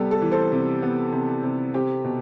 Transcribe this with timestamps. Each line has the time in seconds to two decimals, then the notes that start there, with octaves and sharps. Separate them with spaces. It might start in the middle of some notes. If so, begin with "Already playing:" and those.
Already playing: C3 G3 B3 G4 A4
0.11 A4
0.21 E3
0.32 A4 C5
0.52 C3
0.82 B3
1.12 C3
1.43 C3
1.74 C4 G4
2.04 B2